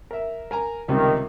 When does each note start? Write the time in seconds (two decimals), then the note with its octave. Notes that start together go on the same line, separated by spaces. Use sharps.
0.11 A#4 E5
0.51 A#4 G#5 A#5
0.88 C#2 C3 D#3 G3